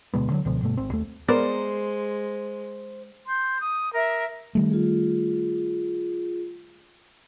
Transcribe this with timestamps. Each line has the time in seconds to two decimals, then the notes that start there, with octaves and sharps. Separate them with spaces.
0.14 D2 B2 G#3 B3
0.30 D3 F3 F#3
0.45 C#2 B2 D3 F3
0.62 G2 B2 A3
0.77 G#1 C4
0.91 D#2 A3
1.28 G#3 B3 A#4 C5 D5
3.28 C6 G6
3.60 D#6
3.93 A#4 E5
4.55 D#3 G3 A3
4.69 F4 G#4